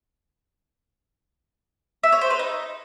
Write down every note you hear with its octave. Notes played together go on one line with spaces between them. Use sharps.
E5
C#5
C5
B4
D#4